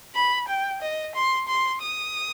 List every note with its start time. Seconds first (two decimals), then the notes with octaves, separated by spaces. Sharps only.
0.15 B5
0.48 G5
0.81 D#5
1.15 C6
1.48 C6
1.82 D#6